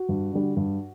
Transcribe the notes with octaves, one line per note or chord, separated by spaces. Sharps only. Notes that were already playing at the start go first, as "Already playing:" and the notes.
Already playing: F#4
G2
D3 G3
G2